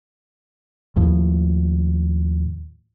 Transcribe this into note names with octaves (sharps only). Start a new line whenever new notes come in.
D#2 A2 F3